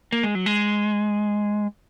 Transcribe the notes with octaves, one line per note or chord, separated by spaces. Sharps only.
A#3
G#3
F#3
G#3